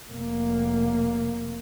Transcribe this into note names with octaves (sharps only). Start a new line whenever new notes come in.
F1 A#3